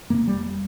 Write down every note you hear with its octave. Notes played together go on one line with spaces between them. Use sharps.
F2 C3 A#3
G3